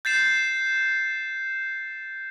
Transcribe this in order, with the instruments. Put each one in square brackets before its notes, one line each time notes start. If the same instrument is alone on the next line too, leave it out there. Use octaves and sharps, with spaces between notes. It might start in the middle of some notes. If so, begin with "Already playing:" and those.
[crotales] G6 A6 C7 E7